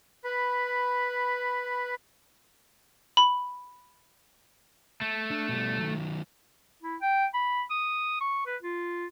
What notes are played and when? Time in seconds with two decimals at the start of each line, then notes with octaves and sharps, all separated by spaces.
0.24 B4 B5
3.17 B5
5.01 A3
5.31 D4
5.49 B2 G3
5.79 D#3 F#3
6.83 E4
7.01 G5
7.34 B5
7.70 D#6
8.20 C#6
8.46 B4
8.62 F4